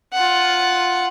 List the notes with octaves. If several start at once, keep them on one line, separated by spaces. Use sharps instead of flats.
F4 F#5